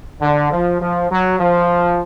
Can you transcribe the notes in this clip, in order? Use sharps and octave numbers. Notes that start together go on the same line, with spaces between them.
D3
F3
F3
F#3
F3